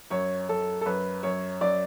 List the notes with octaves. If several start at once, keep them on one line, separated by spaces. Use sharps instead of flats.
F#2 C#5
F#2 A4
A4
F#2 B4
F#2 C#5
F#2 D5